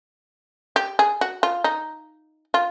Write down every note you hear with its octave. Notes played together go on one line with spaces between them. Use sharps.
G4
G#4
F#4
F4
D#4
F4